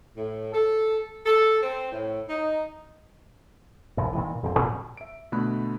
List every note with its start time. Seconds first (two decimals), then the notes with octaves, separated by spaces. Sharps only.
0.16 A2
0.53 A4
1.25 A4
1.62 C4
1.92 A2
2.28 D#4
3.97 E1 C2 F#2
4.13 A#2 D#3 E3
4.43 D#1 F#2 C4
4.59 A2
4.97 E5 D7
5.32 B2 D3 A3 B5 F#6